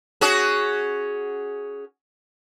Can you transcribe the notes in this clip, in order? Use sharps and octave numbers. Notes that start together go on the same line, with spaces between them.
C#4 F#4 G#4